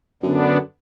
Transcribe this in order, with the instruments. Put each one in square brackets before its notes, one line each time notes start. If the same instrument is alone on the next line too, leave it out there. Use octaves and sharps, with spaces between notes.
[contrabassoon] F#2 [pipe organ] D3 B3 D4